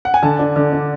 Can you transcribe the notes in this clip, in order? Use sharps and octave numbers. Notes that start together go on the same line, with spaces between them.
F#5
G#5
D3 A5
D4
D3
D4